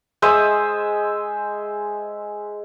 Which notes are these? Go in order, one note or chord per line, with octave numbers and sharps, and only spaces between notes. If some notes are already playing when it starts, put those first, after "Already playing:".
G#3 C5 E5 D#6